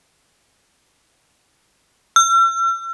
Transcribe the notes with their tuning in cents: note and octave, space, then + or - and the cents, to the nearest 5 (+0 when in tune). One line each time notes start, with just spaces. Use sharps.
E6 +45